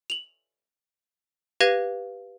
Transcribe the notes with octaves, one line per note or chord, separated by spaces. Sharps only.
F7 F#7
G4 B4 F5 G#6 A#6 D#7